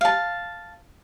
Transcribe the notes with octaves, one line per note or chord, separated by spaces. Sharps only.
F5 A5